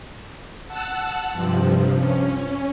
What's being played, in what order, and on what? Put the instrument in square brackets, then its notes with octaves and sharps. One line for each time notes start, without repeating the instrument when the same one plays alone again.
[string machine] F#5 A5 E6 F#6
G2 C3 F3
C#4